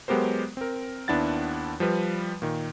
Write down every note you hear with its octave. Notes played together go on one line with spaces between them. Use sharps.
F#3 G#3 B3 G4 A#4 C5
C4 A#4
D#2 B3 D4 E4 F#5 A6
F3 G3 B4
A#2 D#3